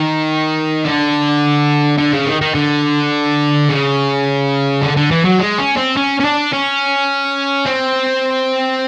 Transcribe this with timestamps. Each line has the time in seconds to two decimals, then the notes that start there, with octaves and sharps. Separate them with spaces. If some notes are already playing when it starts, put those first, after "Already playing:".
Already playing: D#3
0.85 D3
1.98 D3
2.13 C#3
2.26 D#3
2.41 D#3
2.55 D3
3.69 C#3
4.82 D3
4.97 D3
5.11 E3
5.25 F#3
5.39 G#3
5.58 C#4
5.77 C4
5.97 C#4
6.20 C#4
6.25 D4
6.53 C#4
7.66 C4